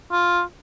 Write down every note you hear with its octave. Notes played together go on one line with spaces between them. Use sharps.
F4